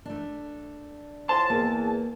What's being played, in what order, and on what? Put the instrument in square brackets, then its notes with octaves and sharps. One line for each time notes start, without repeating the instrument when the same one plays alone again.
[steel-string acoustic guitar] A3 D4
[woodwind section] A2 F3 C6 [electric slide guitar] A5
[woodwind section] E2 [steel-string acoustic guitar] A#3